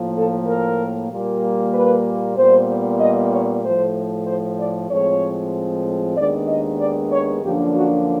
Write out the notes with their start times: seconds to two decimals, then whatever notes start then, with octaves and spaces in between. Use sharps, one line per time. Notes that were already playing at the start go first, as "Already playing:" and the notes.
Already playing: A2 F3 A#3
0.15 A4
0.47 A#4
1.10 A#2 G3 A#3
1.73 B4
2.36 A#2 G3 B3 C5
3.00 D#5
3.31 C#5
3.63 A2 F3 A3 C5
4.27 C5
4.58 D5
4.90 A2 F3 G#3 C4 C#5
6.16 D#2 D#3 G#3 B3 D4 D5
6.48 D#5
6.80 D5
7.11 C#5
7.43 F#2 D3 F3 A#3 D4 G4
7.74 F#4